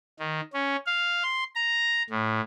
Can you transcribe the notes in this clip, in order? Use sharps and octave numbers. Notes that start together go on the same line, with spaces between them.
D#3
C#4
F5
C6
A#5
A2